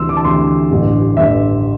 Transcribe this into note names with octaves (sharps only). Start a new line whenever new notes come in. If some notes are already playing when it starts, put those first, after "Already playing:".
Already playing: D2 C3 E3 C6 E6
D6
A5
D2 C3 E3 C6
A1 G2 D3
A1 G2 D3 E5